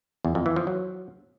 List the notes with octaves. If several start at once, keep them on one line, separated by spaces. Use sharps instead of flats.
E2
F2
E3
F3
F#3